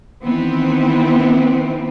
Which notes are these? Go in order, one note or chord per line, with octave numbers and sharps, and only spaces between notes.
D#3 E3 B3 C4